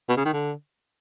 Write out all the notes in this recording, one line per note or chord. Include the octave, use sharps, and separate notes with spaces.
B2
C#3
D#3
D3